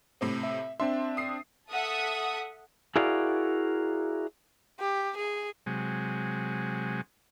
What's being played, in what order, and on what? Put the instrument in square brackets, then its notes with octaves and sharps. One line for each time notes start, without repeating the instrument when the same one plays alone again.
[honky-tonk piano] A2 C3 C4
[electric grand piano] E5
[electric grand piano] C4 D4 E5 [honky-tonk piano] C6
[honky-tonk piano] D#6 C7
[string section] A4 E5 F#5 D#6
[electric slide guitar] E4 F#4 G#4 A#4 D5 F5
[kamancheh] G4
G#4
[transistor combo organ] C3 F#3 G#3